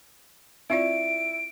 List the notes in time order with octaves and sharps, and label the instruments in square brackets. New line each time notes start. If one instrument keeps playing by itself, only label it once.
[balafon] C4 F4 D5 [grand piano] E4 [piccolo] D7